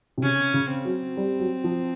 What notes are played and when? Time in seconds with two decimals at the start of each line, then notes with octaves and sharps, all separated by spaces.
0.18 C3
0.22 C#3 C#4
0.54 C#3
0.69 C4
0.85 F#3
1.17 G3
1.40 F#3
1.64 F3